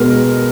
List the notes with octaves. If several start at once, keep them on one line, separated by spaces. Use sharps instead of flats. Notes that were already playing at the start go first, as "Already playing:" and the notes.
Already playing: B2 G#3 B3 A#4